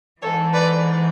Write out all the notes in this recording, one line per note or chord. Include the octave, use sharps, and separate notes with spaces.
G#2 E3 A4 C#5
B4 D5